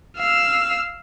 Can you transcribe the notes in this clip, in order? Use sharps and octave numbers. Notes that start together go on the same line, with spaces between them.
F5 E6